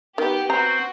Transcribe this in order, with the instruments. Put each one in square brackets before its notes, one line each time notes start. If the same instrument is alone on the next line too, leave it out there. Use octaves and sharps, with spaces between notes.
[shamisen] D#3 [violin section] B3 G4
[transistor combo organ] C4 [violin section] F#4 [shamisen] A#5